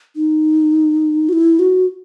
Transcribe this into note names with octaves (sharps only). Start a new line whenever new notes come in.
D#4
F#4
E4
F#4